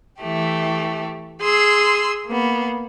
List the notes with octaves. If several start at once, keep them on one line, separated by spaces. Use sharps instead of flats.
E3 A3 G4
G#4 C6 E6
A#3 B3